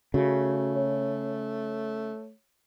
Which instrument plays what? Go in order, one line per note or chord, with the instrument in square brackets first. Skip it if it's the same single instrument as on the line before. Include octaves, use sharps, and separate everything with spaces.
[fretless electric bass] C#3 [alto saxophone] A3 [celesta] F#4
[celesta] C#5